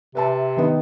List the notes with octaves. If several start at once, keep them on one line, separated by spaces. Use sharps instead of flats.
C3 B4 E5 A5
D#3 B3 D#5